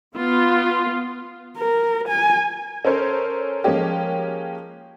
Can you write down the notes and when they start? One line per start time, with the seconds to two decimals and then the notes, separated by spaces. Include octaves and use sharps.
0.16 B3 F4
1.58 A#4
2.08 G#5
2.85 C#4 A4 A#4 C5 C#5
3.64 F3 G#3 A#3 C#4 G4